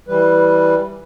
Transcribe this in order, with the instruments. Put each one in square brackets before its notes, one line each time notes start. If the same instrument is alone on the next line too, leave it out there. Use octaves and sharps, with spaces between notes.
[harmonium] E3 G3 B4